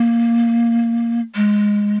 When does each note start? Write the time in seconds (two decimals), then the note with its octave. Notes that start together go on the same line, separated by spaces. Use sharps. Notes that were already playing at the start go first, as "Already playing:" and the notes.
Already playing: A#3
1.35 G#3